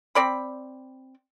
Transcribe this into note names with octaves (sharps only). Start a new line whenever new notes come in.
C4 D5 B5